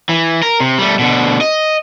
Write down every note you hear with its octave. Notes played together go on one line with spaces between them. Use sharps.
E3
A#4
C3
G3 A3
B2 D3
D#5